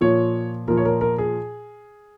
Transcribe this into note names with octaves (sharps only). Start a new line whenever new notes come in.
A#2 F3 C#5
A#2 F3 A#4
C#5
A#4
A#4
G#4